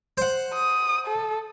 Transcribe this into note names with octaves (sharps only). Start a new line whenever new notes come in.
C5 F#5
D#6
A4